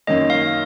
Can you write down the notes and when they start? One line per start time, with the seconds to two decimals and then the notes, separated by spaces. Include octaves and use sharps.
0.07 F#2 D#3 A#3 C#4 D#5
0.30 F5